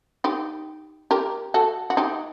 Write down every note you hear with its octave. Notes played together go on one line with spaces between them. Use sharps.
D#4 G4
G4 A#4
F#4 A4
F#4
D#4 G4